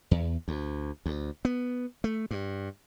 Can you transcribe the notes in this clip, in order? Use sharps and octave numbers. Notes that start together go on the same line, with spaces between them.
E2
D2
D2
B3
A3
G2